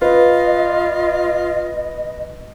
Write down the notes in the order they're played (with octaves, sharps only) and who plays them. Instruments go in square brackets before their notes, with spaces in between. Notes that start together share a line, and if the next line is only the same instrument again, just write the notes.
[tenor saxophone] F4 [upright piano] B4 [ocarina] D#5